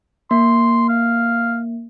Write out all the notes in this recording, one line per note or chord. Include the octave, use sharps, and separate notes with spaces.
A#3 C6
F5